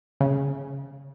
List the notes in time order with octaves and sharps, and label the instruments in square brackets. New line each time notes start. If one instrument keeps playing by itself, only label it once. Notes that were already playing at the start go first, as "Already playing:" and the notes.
[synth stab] C#3